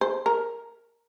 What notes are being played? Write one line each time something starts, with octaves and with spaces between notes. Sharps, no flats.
C5
A#4